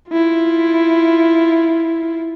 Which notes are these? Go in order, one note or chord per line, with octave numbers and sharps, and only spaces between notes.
E4 F4